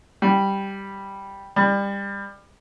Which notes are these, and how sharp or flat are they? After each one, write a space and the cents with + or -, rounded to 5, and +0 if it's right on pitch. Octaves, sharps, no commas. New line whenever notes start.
G3 +0
G3 +25